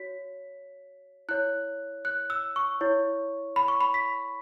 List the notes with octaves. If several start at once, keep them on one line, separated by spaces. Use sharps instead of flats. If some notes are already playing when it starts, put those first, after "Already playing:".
Already playing: F#4 C#5 B6
E4 C#5 F#6
F#6
E6
C#6
E4 C#5
B5
C#6
B5
B6